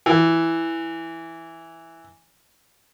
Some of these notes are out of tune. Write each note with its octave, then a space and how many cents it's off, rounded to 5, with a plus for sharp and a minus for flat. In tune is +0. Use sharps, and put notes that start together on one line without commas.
E3 +5